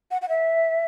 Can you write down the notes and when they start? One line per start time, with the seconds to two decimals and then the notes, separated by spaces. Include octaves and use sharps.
0.11 F#5
0.22 F#5
0.29 E5